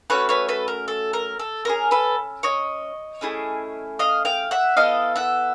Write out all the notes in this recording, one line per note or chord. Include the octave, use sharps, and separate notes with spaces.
A3 C#4 F#4 B4 C#5
B4 C#5
A4 B4
A#4
A4
A#4
A4
C#4 E4 G#4 A#4
A4 B4
C#5 D#5
A3 C#4 E4 G#4
D#5 F5
F5 G5
E5 F#5
B3 E4 A4 D#5 F5
E5 F#5